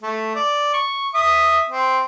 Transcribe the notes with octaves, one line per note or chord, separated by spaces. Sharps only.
A3
D5
C#6
E5 D#6
C4